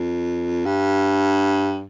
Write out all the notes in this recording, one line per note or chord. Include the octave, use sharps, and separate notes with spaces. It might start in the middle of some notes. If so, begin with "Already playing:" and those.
Already playing: F2
G2